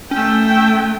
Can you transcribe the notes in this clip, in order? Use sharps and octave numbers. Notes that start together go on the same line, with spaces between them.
A3 C#4 G5